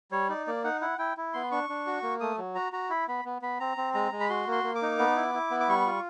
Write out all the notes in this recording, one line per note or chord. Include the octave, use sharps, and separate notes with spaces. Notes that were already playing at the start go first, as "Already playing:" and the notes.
G3 C#5
D#4 D5
A#3 D5
D#4 F#5
E4 F#5
E4 G5
E4
B3 C6
D4 C#6
D4
F#4
A#3
A3 D#6
F#3
F#4 A#5
F#4 A#5
E4 B5
B3 B5
B3
B3 B5
C4 A#5
C4
G#3 A#5
G#3
B5
F#4 C6
A#3 C6
A#3
D6
D#4
B3
E4
E4
B3
D6
G3 C#6
F4